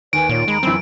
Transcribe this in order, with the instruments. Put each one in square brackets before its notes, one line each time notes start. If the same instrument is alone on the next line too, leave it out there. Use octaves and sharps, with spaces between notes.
[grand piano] D#2 [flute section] B4 D5 G#5 [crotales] D7
[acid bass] A#2 [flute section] F4 C#5 D5
[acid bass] G#3 [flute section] A#5 B5
[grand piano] F#2 E3 [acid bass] C4 [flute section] B5 E6